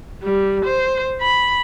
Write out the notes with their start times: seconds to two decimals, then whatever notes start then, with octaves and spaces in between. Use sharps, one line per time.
0.23 G3
0.64 C5
1.21 B5